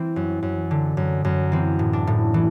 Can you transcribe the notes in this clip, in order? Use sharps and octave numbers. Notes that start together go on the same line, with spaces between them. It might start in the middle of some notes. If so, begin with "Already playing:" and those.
Already playing: E3 C4
F#2
F#2
D3
F#2
F#2
E3 C4
A2
D4
A2
E3